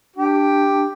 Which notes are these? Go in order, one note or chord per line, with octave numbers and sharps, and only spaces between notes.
D4 G4